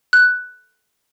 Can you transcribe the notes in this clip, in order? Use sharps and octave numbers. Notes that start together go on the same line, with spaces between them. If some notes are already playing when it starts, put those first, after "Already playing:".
F#6